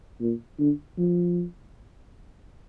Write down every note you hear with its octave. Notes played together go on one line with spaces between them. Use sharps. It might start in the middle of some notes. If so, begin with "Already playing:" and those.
A#2
D3
F3